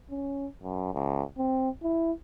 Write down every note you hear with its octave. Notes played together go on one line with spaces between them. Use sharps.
C#4
F#2
C#2
C4
E4